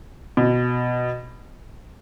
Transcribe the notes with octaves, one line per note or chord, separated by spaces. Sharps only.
B2